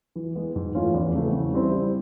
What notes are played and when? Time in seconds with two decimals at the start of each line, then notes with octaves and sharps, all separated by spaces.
0.16 E3
0.35 G#3 B3
0.56 G#2
0.75 E3 A3 C#4 F4
0.94 E2
1.14 C#3 E3 A3 C4
1.33 C#3
1.52 E3 G3 C4 E4
1.71 G3